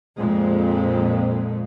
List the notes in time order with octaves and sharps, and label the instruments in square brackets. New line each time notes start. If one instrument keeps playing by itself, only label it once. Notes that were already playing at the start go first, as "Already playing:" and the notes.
[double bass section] F2 A#2 G#3